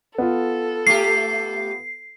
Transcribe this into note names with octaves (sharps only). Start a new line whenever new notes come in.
B3 F4 A4
A3 G4 C7